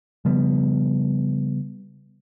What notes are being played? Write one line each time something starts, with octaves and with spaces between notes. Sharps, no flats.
C#3 F3 G3 B3